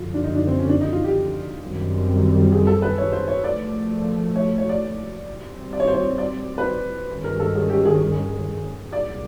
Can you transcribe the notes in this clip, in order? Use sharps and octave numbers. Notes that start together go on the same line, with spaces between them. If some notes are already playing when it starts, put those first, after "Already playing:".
Already playing: F#2 D3 F3 F4
D4
D#4
D4
C4
C#4
D4
D#4
F4
G4
F#2 D#3 G3 C4
G#4
A4
B4
C#5
C5
C#5
A#2 F3 A3 D5
C#5
C#5
D5
A#2 G3 C4
D5
C#5
C5
C#5
D5
B4
C5
G2 D#3 G#3 C#4
A#4
A4
G#4
G4
G#4
C2 A#2 F#3 D5